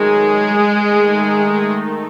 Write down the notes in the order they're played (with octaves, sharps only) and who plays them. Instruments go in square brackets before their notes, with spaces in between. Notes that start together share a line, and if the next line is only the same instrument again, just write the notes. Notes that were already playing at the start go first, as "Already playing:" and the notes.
Already playing: [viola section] D#3 F#3 G#3 A3 D#4 G#4
D#3 A3 D#4